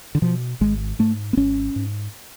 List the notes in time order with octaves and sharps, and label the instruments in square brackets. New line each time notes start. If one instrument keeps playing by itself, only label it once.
[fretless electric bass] D3
B2 F3
G#1 G#3
G#2 A3
B3
G#1 C#4
G#2